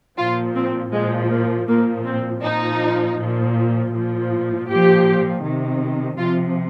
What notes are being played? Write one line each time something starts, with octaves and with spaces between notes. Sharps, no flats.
A#2 F3 F4
C4
A#2 F3 G#3
A#3
A#2 F3 A#3
C4
A#2 F3 D#4
A#2 F3
A#2 F3
A#2 F3 G4
C3 D#3
C3 F3 F4